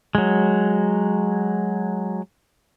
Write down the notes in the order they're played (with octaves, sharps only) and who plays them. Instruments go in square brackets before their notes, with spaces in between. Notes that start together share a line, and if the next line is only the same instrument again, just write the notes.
[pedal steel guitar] F#3 G#3